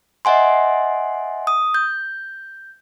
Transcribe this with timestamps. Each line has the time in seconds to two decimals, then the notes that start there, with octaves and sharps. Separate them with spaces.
0.25 D#5 E5 F#5 G#5 C6
1.47 D#6
1.74 G6